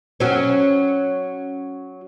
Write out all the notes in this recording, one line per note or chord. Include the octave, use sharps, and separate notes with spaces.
F#3 C#4